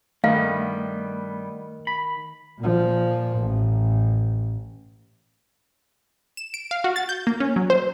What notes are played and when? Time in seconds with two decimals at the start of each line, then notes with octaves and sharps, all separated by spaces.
0.24 G2 D#3 G3 A3 B3 F5
1.87 B5
2.59 A#2 F3
3.39 A1
6.37 E7
6.54 D7
6.71 F5
6.84 F#4
6.96 A6
7.09 G6
7.27 A#3
7.40 C#4
7.56 F#3
7.70 C5